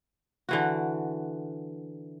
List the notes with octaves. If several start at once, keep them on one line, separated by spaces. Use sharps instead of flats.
D3 E3 F#4